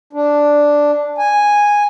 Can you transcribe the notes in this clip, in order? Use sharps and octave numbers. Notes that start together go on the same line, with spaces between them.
D4
G#5